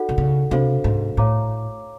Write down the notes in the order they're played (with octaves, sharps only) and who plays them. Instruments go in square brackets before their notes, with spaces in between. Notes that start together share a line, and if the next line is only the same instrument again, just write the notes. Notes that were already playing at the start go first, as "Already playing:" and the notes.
Already playing: [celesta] D#4 F#4 A4 D5 F#5
[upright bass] C3
C#3
[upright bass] C3 [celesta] D4 F#4 A4 C5 F5
[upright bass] G#2
[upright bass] A2 [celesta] C#5 F5 A#5 D6